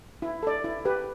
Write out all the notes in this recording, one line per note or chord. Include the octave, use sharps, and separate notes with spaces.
E4
A4 D5
E4
G4 B4